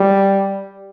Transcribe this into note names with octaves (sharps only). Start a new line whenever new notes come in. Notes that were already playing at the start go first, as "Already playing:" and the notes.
Already playing: G3